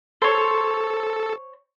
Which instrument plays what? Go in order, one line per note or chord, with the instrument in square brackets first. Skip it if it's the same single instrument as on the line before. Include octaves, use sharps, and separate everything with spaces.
[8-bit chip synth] A4 [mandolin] C5 C#5